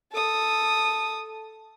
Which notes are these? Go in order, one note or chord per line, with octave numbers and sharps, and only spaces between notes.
A4 D#6